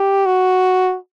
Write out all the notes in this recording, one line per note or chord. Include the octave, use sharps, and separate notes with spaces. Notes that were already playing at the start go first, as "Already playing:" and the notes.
Already playing: G4
F#4